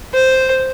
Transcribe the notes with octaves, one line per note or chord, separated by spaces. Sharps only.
C5